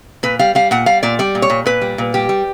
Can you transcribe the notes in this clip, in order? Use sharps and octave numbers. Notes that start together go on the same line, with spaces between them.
A#2 B4
G3 F5
G3 F5
A#2 F#5
G3 F5
A#2 D5
G3 D5
A#2
C#5
A#2
A#2 B4
G3
A#2
G3 G4
G3